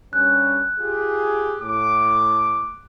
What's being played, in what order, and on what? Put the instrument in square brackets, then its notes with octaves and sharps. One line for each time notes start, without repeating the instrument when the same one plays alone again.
[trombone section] G2 C#4 [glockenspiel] F#6
[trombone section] F4 G4 G#4
[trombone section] A2 [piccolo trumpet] D6